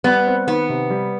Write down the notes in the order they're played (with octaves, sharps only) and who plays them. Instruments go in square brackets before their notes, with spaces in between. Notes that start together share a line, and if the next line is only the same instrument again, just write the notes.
[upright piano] G3 [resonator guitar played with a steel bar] B3
[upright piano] C4
[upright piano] D#3 [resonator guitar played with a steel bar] B3
[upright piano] C3
G3